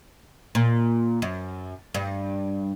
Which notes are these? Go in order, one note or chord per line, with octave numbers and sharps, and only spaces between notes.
A#2
F#2
G2